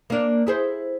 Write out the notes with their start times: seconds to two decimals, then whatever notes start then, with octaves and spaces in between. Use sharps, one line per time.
0.10 A#3 D4
0.47 E4 G#4 C5